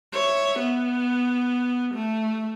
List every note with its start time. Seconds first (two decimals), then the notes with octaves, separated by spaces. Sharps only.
0.12 C#5 E5
0.59 B3
1.94 A3